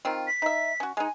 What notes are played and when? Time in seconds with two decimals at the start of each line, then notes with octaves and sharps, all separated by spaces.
0.05 D#3 C4 F4
0.27 B6
0.42 D#4 E5
0.80 C#4 F#4
0.97 G#3 D#4 G#5